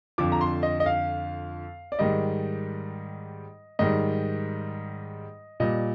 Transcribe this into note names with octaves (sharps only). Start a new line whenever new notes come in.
F2 D3 F3 D6
A#5
C6
D#5
D#5
F5
D5
G#2 D#3 G3 D#5
G#2 D#3 G3 D#5
A#2 G3 D#5